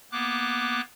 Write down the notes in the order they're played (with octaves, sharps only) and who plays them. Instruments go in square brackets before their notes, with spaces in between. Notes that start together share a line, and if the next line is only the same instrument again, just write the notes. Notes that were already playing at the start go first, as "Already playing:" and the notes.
[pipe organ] A#3 B3 D6 F#6